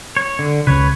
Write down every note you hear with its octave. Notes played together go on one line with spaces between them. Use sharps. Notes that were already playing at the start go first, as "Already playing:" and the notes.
C#5
D3
C#2 C#3 B4 C#5